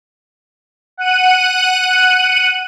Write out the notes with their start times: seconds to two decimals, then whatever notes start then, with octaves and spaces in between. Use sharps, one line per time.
0.97 F#5 F#6 D#7